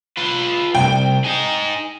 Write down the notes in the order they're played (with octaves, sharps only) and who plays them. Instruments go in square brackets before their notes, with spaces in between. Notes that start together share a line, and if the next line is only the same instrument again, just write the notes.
[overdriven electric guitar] F4 B4
[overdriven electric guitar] C2 [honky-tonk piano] G5
[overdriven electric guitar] D#4 G#4